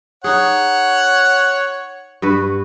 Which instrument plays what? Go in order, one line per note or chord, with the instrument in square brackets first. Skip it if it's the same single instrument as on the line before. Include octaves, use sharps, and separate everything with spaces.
[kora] D#4 G#4 [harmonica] C#5 F#5
[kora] G2 F#4 B4